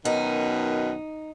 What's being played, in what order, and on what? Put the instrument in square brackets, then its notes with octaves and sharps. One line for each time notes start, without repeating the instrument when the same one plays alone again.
[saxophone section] F#2 B2 D#3 [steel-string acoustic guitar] D#4